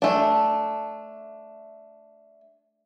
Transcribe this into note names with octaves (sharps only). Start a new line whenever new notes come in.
A3 D4